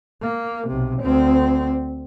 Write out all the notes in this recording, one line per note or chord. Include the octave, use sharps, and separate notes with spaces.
A#3
B1 C3
D2 C4